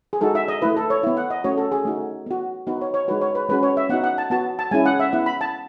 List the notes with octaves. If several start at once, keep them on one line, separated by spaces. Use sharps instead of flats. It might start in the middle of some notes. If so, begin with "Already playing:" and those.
G#4
G#3 D#4 F#4 A4
E5
D#5
A3 E4 B4
A4
C#5
B3 E4
F#5
D#5
A3 C#4 F#4 C#5
A4
G#4
A3 D#4 F#4
B3 F#4
B3 D#4 F#4 B4
C#5
C#5
G#3 D#4 F#4 B4
C#5
B4
G#3 C#4 F#4 B4
C#5
E5
B3 D#4 F#4 F#5
F#5
A5
B3 F#4 A5
A5
G#3 C#4 E4 G#5
F#5
E5
B3 E4 F#5
B5
A5